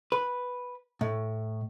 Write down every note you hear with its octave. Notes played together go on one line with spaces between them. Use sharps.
B4
A2